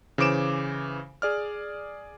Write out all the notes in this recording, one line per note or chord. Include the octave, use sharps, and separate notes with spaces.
C#3 E3 C5 D6 D7 E7
G#4 D5 F6